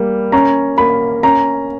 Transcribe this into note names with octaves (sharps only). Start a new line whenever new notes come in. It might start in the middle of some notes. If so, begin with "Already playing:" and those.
Already playing: G3 A#3
C#4 A#5
A#3 B5
C#4 A#5